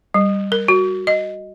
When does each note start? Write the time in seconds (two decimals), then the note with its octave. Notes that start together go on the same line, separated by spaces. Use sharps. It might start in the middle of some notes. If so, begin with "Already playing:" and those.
0.14 G3
0.52 A#4
0.68 F#4
1.07 D#5